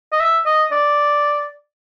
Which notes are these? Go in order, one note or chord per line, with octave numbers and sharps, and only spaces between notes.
D#5
E5
D#5
D5